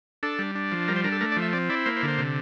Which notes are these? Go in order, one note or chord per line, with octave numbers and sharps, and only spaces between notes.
D4 A4
G3
D4
F3
G3 A#4
C5
D4 A#4
A4
A3 A#4
D5
F3
E5
C4 D5
E4 D5
A#3 C5
C5
D3
C5
C3